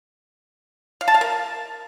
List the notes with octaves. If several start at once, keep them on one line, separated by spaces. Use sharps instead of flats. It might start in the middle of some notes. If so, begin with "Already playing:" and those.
F5
A5
F5
A#4